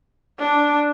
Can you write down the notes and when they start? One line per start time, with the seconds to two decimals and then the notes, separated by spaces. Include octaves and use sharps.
0.39 D4